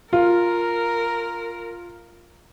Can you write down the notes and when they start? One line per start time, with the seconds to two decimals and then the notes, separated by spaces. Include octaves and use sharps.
0.13 F4 A#4